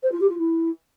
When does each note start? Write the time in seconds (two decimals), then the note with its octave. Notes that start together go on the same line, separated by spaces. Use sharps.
0.03 C5
0.12 F4
0.21 G4
0.29 F4
0.38 E4